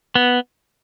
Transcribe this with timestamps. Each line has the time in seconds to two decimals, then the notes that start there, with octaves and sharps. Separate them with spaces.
0.15 B3